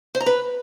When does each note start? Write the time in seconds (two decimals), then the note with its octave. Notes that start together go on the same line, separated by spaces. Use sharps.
0.15 C5
0.20 A#5
0.26 B4